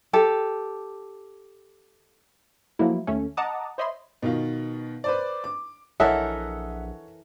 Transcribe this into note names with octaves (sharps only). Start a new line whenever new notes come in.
G4 A4
F3 F#3 A3 A#3 E4
D#2 A3 C#4
D#5 F#5 A5 A#5 D6 D#6
C5 C#5 D#5 E5 B5 C6
B2 D#3 F4
B4 C5 D5
D6
A#1 E3 A4 A#4 C#5 D#5 E5 F#5